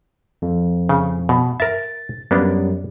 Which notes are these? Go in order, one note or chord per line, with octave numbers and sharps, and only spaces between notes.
F2
C#3
B2
A#4 E5 A6
F#2 G3 A#3 B3 D4